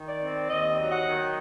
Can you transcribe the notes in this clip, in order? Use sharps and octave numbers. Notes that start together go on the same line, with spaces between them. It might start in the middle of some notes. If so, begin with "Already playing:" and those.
Already playing: D#3
D5
C4
D#2 D#5
F#3
F#5
D#3